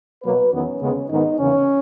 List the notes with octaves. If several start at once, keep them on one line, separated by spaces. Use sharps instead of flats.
B2 F#3 A#3 B4
E2 D#3 F#3 B3 C#4
D#2 C#3 G#3 B3
G#2 D#3 G#3 B3 D#4
E2 C#3 E3 A#3 C#4